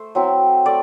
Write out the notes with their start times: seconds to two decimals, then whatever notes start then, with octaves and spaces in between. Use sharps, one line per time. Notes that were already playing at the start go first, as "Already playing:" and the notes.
Already playing: A3 C5
0.15 F#3 C4 E4
0.66 A3 D5